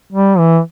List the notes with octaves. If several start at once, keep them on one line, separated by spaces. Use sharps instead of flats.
G3
E3